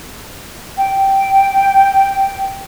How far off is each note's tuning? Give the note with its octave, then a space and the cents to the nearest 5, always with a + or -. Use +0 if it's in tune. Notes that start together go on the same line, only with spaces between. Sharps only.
G5 -10